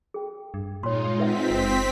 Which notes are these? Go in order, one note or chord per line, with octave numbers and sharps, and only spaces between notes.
G#4 G5
G2
A#2 G#3 D#4 F4 C#5 C6
C4 B4 E5 F#5 B6
F#1